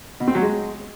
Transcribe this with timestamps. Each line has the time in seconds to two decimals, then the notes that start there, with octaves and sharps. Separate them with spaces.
0.20 B2
0.28 C4
0.35 F#3
0.42 G#3